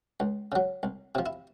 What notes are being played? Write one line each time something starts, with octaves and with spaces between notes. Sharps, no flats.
C#2
C#3 F#3
C2
C3 F3
E4